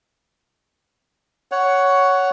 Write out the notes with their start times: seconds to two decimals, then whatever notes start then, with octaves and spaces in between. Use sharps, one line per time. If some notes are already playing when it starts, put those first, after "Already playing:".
1.52 C#5 F#5